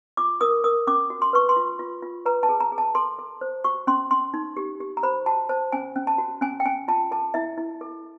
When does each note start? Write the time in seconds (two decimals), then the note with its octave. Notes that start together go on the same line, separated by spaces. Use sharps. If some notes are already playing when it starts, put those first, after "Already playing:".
0.17 F4 D6
0.41 A#4 D#6
0.64 A#4 D#6
0.87 C#4 D6
1.10 F#4
1.22 C6
1.33 B4 C#6
1.49 C6
1.56 F4
1.79 F4
2.02 F4
2.26 B4 A#5
2.43 A5
2.49 G#4
2.60 A#5
2.72 G#4
2.78 A5
2.95 A4 C6
3.19 A4
3.41 C5
3.64 F#4 C#6
3.87 C#4 C6
4.11 C#4 C6
4.34 D#4
4.57 G4
4.80 G4
4.97 A#5
5.03 C5 B5
5.26 F#4 A5
5.49 C5 A5
5.72 C#4 G#5
5.96 C#4
6.07 A5
6.18 F#4
6.41 C#4 G#5
6.60 G5
6.65 C#4 G#5
6.88 F4 A5
7.11 A4 A5
7.34 E4 E5
7.58 E4
7.81 A4